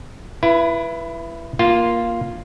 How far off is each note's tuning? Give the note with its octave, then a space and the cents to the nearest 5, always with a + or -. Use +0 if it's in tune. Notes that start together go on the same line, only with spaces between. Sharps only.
E4 +25 B4 -15
A#3 +15 F4 -5